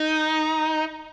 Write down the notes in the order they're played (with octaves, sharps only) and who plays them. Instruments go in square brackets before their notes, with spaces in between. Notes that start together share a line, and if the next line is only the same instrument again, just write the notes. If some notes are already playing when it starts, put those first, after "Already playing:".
Already playing: [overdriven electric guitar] D#4